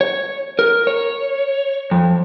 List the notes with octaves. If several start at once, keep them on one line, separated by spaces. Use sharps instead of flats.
C#5
A#4
C#5
F2